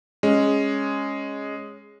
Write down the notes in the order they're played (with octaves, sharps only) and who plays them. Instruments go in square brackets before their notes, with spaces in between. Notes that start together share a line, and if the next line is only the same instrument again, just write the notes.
[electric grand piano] G#3 C#4